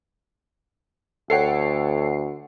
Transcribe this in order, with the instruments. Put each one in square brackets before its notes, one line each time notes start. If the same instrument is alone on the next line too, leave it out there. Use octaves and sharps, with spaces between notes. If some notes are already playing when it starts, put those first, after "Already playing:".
[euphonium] D2 [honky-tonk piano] A4 C#5 G5 [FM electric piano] F#5 C7